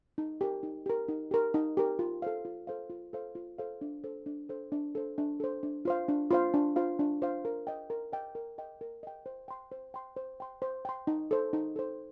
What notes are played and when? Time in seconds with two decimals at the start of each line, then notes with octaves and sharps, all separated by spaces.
0.18 D#4
0.41 G4 A#4
0.63 D#4
0.86 G4 A#4
1.08 D#4
1.31 G4 A#4
1.54 D#4
1.77 G4 A#4
1.99 F4
2.22 A4 C5 F5
2.45 F4
2.67 A4 C5 F5
2.90 F4
3.13 A4 C5 F5
3.35 F4
3.58 A4 C5 F5
3.81 D4
4.04 A4 C5
4.26 D4
4.49 A4 C5
4.72 D4
4.95 A4 C5
5.18 D4
5.40 A4 C5
5.63 D4
5.85 F4 C5 F5
6.08 D4
6.31 F4 C5 F5
6.54 D4
6.76 F4 C5 F5
6.99 D4
7.22 F4 C5 F5
7.45 A#4
7.67 D#5 G5
7.90 A#4
8.12 D#5 G5
8.35 A#4
8.58 D#5 G5
8.81 A#4
9.03 D#5 G5
9.26 C5
9.48 G5 C6
9.72 C5
9.94 G5 C6
10.17 C5
10.40 G5 C6
10.62 C5
10.85 G5 C6
11.07 D#4
11.31 A4 C5
11.53 D#4
11.76 A4 C5